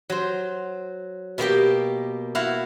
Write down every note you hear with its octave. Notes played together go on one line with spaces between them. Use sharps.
F#3 C5
B2 A#3 G4 G5
E4 F#4 F5